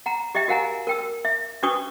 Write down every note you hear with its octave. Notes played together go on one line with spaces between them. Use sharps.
F#5 A#5
G4 D#5 E5 G5
F#4 A#4 F5 F#5 G#5 A#5
A#4 G5 E6
E5
C#4 D4 F#4 B4 C#6 D#6